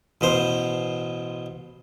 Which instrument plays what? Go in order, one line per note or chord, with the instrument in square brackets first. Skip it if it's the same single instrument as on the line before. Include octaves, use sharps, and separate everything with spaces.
[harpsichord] A1 B2 C5